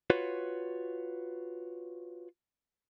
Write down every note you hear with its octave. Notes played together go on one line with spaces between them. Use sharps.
F4 F#4 B4 C#5